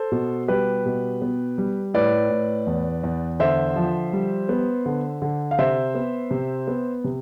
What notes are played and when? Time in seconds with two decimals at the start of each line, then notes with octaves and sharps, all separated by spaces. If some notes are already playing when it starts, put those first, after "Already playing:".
Already playing: A4 C5
0.12 B2
0.48 G3 G4 B4
0.85 B2
1.22 B3
1.58 G3
1.94 A2 B4 D5
2.30 A2
2.67 E2
3.03 E2
3.40 D3 C5 E5
3.76 F3
4.13 G3
4.49 B3
4.86 D3
5.22 D3
5.51 F5
5.58 C3 C5 E5
5.95 B3
6.31 C3
6.68 B3
7.04 C3